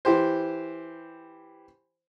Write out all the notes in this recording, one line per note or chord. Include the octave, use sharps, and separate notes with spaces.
E3 G4 C5